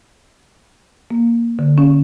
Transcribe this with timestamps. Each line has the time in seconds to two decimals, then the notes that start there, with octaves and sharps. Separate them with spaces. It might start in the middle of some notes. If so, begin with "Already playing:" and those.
1.10 A#3
1.59 D3
1.78 C#4